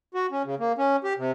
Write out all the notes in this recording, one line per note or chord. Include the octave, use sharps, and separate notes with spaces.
F#4
C#4
C#3
A#3
C#4
G4
C3